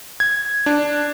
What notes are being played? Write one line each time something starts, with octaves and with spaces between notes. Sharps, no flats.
G#6
D4